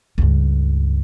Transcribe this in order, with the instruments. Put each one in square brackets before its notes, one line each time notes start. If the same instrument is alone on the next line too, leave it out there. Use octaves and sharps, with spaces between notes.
[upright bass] C#2 G2